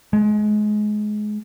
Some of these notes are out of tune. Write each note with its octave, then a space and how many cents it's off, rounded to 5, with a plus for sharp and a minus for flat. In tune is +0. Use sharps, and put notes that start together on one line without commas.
G#3 +25